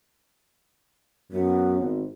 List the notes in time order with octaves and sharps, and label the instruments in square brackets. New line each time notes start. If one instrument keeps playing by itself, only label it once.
[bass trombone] F#2 [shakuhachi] B3
[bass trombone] G#1